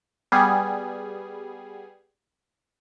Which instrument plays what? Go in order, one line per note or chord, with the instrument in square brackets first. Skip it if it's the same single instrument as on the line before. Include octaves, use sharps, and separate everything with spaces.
[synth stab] G3 B3 G#4